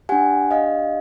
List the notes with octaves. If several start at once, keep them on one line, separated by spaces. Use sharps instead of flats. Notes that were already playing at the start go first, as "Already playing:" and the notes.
D4 G4 F#5 G#5
D#5 F5